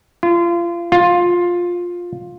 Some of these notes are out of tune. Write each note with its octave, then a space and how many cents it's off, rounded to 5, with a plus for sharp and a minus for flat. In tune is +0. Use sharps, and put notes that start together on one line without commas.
F4 -30
F4 +10